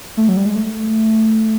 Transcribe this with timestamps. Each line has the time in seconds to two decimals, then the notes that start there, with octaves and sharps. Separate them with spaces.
0.17 A3
0.29 F#3
0.37 G3
0.45 G#3
0.55 A3